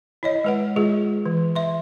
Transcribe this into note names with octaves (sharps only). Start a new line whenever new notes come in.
E4 C#5 D#5
G#3 B4 F#5
G#3 F4 G#4
E3
E5 C6